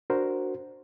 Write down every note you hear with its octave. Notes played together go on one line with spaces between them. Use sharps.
D4 F#4 A#4 C5